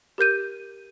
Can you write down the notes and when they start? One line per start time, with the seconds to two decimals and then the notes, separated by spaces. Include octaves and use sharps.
0.18 G4 A#4 G6 D#7